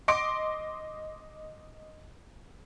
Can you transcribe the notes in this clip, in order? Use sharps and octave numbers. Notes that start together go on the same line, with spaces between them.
D#5 C6 D6 D7